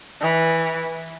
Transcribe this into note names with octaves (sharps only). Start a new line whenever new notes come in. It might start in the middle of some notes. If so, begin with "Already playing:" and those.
E3